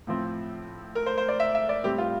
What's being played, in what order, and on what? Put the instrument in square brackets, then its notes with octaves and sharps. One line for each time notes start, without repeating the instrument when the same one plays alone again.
[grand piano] A2 F3 C4
A#4
C5
C5
D5
E5
E5
D5
A2 G3 C4 G4
F4